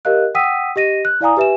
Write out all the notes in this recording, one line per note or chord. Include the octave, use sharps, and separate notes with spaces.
G4 A#4 D#5 F5 F#6
F#5 G5 D#6 E6 B6 D#7
G4 D#5 A#6 D#7
F#6
E4 D5 F5 G#5 A#5 D#6
G4 B4 E5 G#5 E7